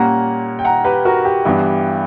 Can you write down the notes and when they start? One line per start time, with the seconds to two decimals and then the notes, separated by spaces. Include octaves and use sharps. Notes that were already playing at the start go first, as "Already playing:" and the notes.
Already playing: A#2 G3 A#3 C#4 F#5 A#5
0.59 G5
0.65 F#5 A#5
0.84 G4 B4
1.05 F#4 A#4
1.25 G4
1.45 G2 E3 B3 D4